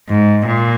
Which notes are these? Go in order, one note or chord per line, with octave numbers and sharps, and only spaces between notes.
G#2
A#2